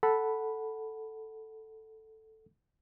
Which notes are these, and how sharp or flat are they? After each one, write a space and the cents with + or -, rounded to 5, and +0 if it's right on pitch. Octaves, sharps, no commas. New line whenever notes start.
A4 +0 F#5 +5 B5 +0